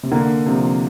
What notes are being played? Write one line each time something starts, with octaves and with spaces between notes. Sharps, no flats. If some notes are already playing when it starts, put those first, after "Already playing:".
C3
D3 A#3
C3 F3